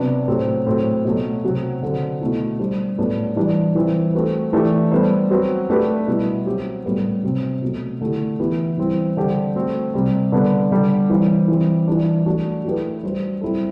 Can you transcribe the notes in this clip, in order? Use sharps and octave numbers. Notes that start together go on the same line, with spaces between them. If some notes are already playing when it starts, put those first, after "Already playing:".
Already playing: C3 F#3 B3 D4 F#4
A2 F#3 C4 G4 C5
A2 F#3 C4
B2 F#3 A3
C3 F#3 C4
D3 F#3 C4
B2 A3 E4
G3 D4 G4 C5
A2 F#3 B3 D4
E3 G3 D4 G4
E3 G3 C4
A3 C4 F#4 B4
E3 A3 D4 G4
G3 B3 D4 A4 C5
F#3 C4 F#4 B4
A3 D4 G4 B4
B2 G3 B3 E4
F#3 C4 G4
A2 G3 B3
C3 F#3 C4
B2 F#3 A3
D3 A3 E4 G4
E3 B3 E4 G4
E3 G3 C4 E4
D3 G3 D4 G4 C5
A3 C4 F#4 A4
C3 G3 C4
D3 G3 B3 D4
D3 G3 D4
E3 G3 C4
E3 G3 C4
E3 G3 D4
F#3 A3 D4 F#4
F#3 A3 E4 G4 B4
G3 D4 F#4 C5
G3 C4 E4 A4